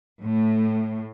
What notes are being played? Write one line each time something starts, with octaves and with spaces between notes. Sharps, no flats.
A2